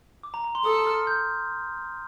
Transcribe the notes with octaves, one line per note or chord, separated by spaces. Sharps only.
D6
A#5
A#5
C6
A4 D#6
F6
G6